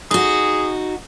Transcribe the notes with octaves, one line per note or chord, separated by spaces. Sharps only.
D#4 F#4 G#4